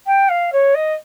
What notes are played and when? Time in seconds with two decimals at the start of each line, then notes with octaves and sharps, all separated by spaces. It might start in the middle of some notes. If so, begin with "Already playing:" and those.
0.06 G5
0.29 F5
0.52 C#5
0.74 D#5